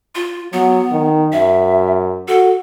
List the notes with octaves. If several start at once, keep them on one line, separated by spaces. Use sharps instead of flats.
F4
F#3 B3
D#3
F#2 E5
F#4 A4